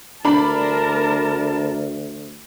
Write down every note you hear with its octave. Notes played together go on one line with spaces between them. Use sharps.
D2 D4 A#4 A5 B5